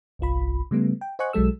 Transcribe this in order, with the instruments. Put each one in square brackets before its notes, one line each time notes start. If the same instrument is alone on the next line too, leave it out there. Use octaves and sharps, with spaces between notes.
[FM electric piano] G1 C2 F4 B5
C#3 G3 A3 B3
G5
C5 D#5 F#5 G#5 C#6 F#6
B1 F#3 G#3 A4 E6